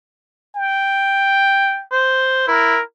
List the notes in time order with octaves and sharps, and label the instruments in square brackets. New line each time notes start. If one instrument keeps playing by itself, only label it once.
[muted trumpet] G5
[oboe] C5
[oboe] E4 [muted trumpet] A#4